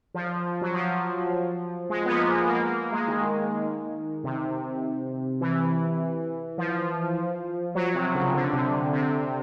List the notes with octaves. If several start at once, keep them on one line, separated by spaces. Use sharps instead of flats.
F3
F#3
F3
G#3
B3
A#3
A#3
A#3
A#3
A#3
G#3
D#3
C3
E3
F3
F#3
C3
C#3
D3
C3
C3